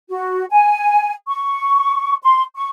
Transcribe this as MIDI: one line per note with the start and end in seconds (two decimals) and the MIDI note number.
0.09 0.45 66
0.50 1.12 80
1.27 2.15 85
2.23 2.43 84
2.56 2.69 85